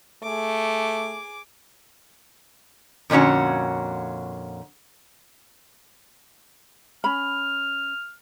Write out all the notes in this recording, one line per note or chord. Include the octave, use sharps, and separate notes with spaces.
A3 G#4 D6
F2 A#2 D3 C#4 F#4
C#4 B5 F6